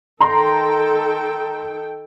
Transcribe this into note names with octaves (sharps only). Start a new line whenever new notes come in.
D#3 A4 G5 A#5 C6